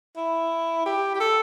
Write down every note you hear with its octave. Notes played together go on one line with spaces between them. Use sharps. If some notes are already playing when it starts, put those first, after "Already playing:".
E4
G4
G4
A4